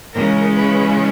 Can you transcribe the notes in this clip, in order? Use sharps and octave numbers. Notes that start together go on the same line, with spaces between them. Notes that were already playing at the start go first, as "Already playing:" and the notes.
C#3 E3 G#3 C#4 A#4
B4